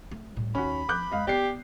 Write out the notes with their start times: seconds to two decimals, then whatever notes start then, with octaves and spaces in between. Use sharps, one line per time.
0.11 A3
0.36 A2 G3
0.55 D#2 C#4 F#4 B5
0.89 F3 D6 F#6 G6
1.11 F2 G#3 D#5 F5
1.27 B3 G4 D5 C7